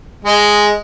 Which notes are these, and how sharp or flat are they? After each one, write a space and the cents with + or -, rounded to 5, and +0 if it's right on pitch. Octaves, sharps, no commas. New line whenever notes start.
G#3 +0 D#5 +0